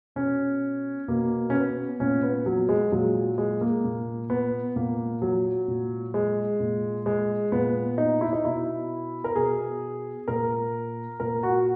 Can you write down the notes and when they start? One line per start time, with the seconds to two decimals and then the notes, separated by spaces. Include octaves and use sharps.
0.16 B2 C#4
1.08 B2 A#3
1.50 C#4
1.54 B3
2.00 A#2 C#4
2.23 B3
2.46 F#3
2.69 G#3
2.92 A#2 F#3
3.38 G#3
3.61 A#3
3.84 A#2
4.30 B3
4.76 A#2 A#3
5.22 F#3
5.68 A#2
6.14 G#3
6.60 A#2
7.06 G#3
7.52 A#2 B3
7.98 D#4
8.21 E4
8.33 D#4
8.44 B2 E4
9.24 A#4
9.36 B2 G#4
10.28 A#2 A#4
11.20 A#2 A#4
11.43 F#4